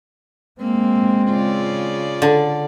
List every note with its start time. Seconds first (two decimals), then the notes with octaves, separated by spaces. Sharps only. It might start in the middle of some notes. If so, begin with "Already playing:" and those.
0.61 G#3 A#3 C4
1.27 C#3 F4 D5
2.22 D3